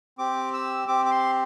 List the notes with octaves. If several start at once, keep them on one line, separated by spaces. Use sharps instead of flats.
C4 G4 D6
E6
C4 G4 D6
D6
C6